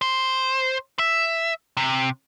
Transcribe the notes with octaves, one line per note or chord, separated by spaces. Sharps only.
C5
E5
C3